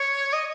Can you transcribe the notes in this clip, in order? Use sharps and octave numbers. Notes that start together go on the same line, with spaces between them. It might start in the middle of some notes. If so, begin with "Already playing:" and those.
Already playing: C#5
D#5